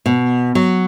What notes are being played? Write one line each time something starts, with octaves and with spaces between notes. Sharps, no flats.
B2
F#3